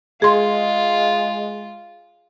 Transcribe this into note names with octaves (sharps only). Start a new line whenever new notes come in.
G#3 F4 G#4 C6